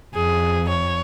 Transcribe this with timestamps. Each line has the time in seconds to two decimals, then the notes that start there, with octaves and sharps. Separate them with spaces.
0.14 F2 G#4
0.69 C#5